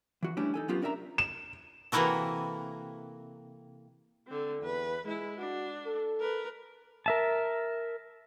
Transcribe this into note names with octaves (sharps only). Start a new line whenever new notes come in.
E3 F#4
E3 G3 A3 C#4 D4 E4
D#4 A4 G#5
F#3 B3 C#4 F4 G4
C#4 D4 A#4 D#5 E5 A#5
E7
C3 E3 A#3 E4 F#4 A4
D3 C4
E2 B4
G#3 E4 G#4
D4 F#4
A4
A#4 B4
A#4 E5 A5